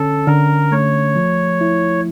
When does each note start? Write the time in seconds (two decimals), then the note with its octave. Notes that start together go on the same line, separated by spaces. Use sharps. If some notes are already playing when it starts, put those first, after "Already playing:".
Already playing: D3 C#4 A4
0.27 D3 A#4
0.72 A3 C#5
1.16 F3
1.61 E4